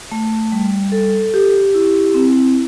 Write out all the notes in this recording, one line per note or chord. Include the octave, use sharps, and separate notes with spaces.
A3
G3
A4
G4
E4
C4